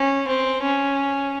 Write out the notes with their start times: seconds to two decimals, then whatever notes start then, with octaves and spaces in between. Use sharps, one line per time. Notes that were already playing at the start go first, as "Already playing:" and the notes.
Already playing: C#4
0.27 C4
0.63 C#4